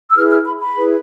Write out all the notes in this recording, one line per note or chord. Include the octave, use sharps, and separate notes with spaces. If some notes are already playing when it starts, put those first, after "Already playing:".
E6
E4 G#4 B4 F6
F6
B5
B5
E4 G#4 B4